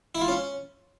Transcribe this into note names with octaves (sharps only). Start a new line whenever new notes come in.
E4
F4
C#4